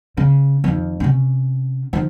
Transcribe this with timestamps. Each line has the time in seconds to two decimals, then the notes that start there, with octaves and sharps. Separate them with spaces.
0.17 C#3
0.64 F2 D#3
1.00 C3 C#4
1.93 D#3 F3